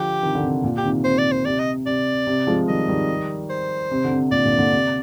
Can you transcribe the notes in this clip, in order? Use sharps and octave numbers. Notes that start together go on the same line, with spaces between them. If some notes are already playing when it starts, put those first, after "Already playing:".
Already playing: D3 F3 G4
C3 D#3
D3
C3
A#2
G4
C3 D#3
C3 C5
D5
C5
C3 D5
D#5
C3 D5
C3
F3 G#3
D#3 G3 D#5
D#3 G3
C5
C3
D3
C3
A#2 D3 D5
A#2 D3
A#2 D3
C3